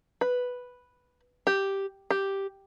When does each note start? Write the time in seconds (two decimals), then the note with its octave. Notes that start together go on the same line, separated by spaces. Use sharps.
0.21 B4
1.47 G4
2.11 G4